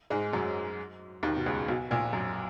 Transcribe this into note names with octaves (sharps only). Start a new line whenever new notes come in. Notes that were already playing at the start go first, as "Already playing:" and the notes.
G#2 G#3
F#2 F#3
D#2 D#3
B2
C#2 C#3
B1 B2
A#1 A#2
F#2